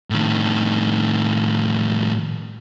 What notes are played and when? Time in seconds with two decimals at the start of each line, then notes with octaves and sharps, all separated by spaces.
0.10 A2 D#3